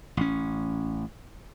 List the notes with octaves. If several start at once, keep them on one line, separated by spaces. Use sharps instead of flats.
A1 C#4